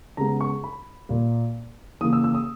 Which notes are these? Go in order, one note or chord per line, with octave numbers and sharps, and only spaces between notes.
C#3 G#3 B3 A#5
C#6
B5
A#2 A#3
C#3 E3 A#3 D#6
E6
E6
D#6